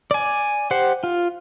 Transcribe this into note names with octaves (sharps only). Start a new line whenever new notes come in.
D5 G#5
G4 C5 F#5
F4